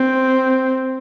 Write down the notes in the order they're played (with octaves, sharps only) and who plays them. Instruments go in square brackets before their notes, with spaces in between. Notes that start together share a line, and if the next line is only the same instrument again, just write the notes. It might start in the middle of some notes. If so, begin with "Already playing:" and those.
Already playing: [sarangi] C4